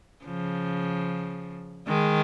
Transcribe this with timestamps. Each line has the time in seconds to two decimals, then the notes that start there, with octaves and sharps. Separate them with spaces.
0.24 C#3 F3
1.87 D#3 G#3